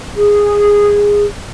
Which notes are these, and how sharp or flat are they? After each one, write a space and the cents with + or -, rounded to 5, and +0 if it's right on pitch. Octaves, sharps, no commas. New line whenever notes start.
G#4 -15